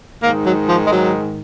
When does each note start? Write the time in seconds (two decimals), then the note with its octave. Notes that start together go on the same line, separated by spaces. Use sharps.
0.23 G#2 D#3 A#3
0.46 F#3
0.69 F3
0.85 G#3
0.91 F#3